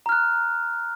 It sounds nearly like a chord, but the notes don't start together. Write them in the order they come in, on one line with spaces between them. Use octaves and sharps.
A#5 F6 F#6